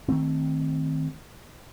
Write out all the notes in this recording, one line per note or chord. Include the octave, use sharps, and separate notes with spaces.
D#3 A3 C4